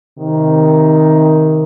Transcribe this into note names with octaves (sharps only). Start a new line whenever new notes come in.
C3 D#3